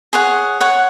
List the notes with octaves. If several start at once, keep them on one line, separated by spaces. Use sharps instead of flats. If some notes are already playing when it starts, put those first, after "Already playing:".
G#4 C#5 F#5
C#5 F#5 C#6